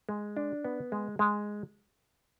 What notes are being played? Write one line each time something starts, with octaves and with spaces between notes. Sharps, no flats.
G#3
D4
B3
G#3
G#3